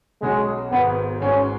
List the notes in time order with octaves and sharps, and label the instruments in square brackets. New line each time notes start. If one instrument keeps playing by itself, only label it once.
[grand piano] B1 B2 F#3 C#4 F#4 [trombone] G#3
[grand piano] G#1 G#2 D#3 [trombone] B3
[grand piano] G#1 G#2 G#3 B3 [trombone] C#4